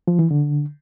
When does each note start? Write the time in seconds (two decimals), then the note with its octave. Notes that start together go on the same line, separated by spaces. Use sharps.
0.08 F3
0.19 E3
0.31 D3